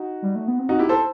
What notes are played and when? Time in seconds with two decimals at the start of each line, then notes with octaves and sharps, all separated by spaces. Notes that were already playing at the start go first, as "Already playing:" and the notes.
Already playing: D#4 F#4
0.22 G3
0.35 A3
0.48 B3
0.59 C4
0.69 D#4 F#4
0.79 E4 G4
0.89 A4 C5